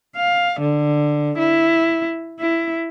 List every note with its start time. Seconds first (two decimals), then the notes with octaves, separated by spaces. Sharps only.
0.17 F5
0.60 D3
1.38 E4
2.40 E4